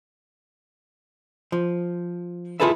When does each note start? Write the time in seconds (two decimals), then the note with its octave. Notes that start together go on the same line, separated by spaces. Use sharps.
1.52 F3
2.60 E4 F4 G#4 A4 B4 E5